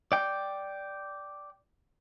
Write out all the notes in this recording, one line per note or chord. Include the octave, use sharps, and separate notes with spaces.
D5 G5